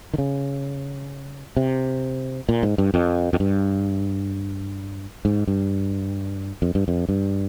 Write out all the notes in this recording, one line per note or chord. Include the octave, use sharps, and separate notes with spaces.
D#3
C#3
C3
A#2
G#2
G2
F2
F2
G2
G#2
G2
F2
G2
F2
G2